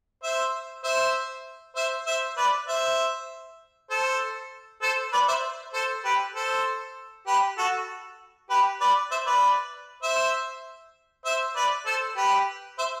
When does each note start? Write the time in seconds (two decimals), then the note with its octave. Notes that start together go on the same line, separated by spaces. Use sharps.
0.23 C5 E5
0.84 C5 E5
1.76 C5 E5
2.07 C5 E5
2.37 B4 D5
2.68 C5 E5
3.90 A4 C5
4.82 A4 C5
5.13 B4 D5
5.28 C5 E5
5.74 A4 C5
6.05 G4 B4
6.35 A4 C5
7.27 G4 B4
7.58 F#4 A4
8.50 G4 B4
8.80 B4 D5
9.11 C5 E5
9.26 B4 D5
10.03 C5 E5
11.25 C5 E5
11.56 B4 D5
11.86 A4 C5
12.17 G4 B4
12.79 C5 E5